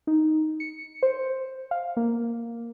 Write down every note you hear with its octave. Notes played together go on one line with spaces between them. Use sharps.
D#4
C#7
C5
F5
A#3